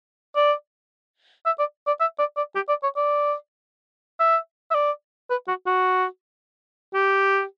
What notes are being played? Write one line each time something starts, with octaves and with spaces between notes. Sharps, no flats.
D5
E5
D5
D5
E5
D5
D5
G4
D5
C#5
D5
E5
E5
D5
B4
F#4
F#4
G4